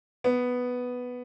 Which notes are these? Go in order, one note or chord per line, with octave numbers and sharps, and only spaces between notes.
B3